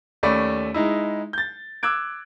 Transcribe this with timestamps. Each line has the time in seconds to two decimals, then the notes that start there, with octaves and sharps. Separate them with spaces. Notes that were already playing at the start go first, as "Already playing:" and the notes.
0.23 D#2 A3 C#4 D5 B5
0.74 G#3 D#4 E4
1.33 G6 A6
1.83 D6 E6 F#6 G#6 D7